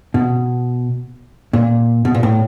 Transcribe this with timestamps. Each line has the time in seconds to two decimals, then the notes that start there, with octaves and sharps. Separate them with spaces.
0.14 B2
1.53 A#2
2.05 B2
2.15 A#2
2.23 A2